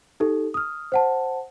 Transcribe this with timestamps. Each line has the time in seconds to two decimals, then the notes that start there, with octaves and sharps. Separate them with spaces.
0.20 D#4 G4 A4
0.54 D#6 F6
0.92 C5 F#5 A5